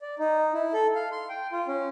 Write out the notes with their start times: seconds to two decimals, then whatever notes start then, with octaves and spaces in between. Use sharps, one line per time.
0.01 D5
0.19 D#4
0.54 E4
0.73 A4
0.95 F5
1.12 C6
1.30 G5
1.52 F4
1.68 C#4